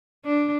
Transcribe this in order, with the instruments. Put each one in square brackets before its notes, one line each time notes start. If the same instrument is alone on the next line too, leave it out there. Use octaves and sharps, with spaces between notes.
[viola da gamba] D4